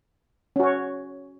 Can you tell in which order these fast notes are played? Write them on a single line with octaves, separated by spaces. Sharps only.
C#4 F#4 C#5